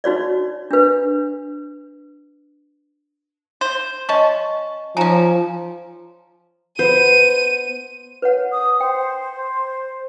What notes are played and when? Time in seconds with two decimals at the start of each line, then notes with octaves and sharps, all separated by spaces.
0.04 D#4 F#4 C#5 D5
0.71 D4 B4
3.61 C5
4.09 C#4 D#5 A5 C#6
4.97 F3 C#4 D#4 G#5 A#5
6.79 B3 C5 D#7
8.22 B4 C#5 F#5
8.52 D#6
8.80 C5 G5